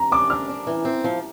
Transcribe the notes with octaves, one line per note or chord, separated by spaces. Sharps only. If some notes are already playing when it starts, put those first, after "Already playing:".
Already playing: A#5
D4 D6
D4 F6
D4
E3
C4
F3